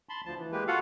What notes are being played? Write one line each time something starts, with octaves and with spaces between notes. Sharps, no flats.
A5 B5 C6
D2 F3 A5
E3
G#3 A#3 G4 B4
F4 F#4 A4 F5 F#5